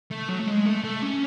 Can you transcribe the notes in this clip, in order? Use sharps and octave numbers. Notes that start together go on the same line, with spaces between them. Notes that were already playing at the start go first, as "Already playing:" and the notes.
A3
F#3
A3
G#3
A3
A3
C#4